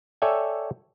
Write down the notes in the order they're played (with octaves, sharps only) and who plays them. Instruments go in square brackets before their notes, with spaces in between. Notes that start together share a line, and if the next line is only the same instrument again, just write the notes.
[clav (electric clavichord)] A4 C#5 D5 E5 G5 G#5